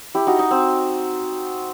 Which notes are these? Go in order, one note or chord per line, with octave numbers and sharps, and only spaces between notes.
E4 G4
D#4 F#4
D#4
C4